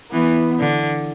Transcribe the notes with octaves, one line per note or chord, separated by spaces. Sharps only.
E3 B3
D3